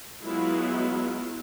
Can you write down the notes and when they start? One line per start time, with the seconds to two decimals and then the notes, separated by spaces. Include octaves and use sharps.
0.23 F#3 G#3 B3 E4 F4